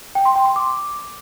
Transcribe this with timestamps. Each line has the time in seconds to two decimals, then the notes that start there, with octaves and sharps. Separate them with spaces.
0.15 G5
0.25 C6
0.36 G5
0.46 C6
0.56 D6